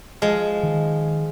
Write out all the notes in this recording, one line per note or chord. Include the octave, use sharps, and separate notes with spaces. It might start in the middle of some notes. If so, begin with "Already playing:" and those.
F3 G#3
D#3